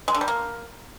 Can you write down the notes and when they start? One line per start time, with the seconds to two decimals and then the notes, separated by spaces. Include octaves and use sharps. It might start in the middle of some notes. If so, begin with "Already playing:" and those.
0.08 G#3
0.14 D3
0.21 G3
0.28 A#3